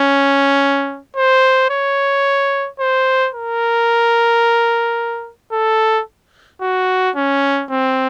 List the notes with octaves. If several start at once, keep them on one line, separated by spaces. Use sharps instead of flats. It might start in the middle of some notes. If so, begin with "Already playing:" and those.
Already playing: C#4
C5
C#5
C5
A#4
A4
F#4
C#4
C4